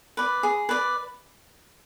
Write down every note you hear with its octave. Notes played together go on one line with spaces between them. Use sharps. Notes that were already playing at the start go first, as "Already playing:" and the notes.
B4 D5
G#4
B4 D5